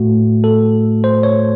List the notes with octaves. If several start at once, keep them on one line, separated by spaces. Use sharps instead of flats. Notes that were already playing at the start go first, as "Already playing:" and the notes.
Already playing: A2 A3 F#4
A4
C5
C#5